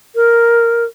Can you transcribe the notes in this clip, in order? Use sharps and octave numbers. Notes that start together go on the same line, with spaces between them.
A#4